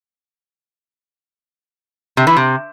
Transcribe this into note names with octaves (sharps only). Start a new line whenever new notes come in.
C3
E3
C3